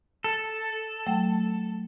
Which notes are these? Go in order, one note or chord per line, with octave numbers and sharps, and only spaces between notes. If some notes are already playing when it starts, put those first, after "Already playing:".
A4
F#3 A3 G5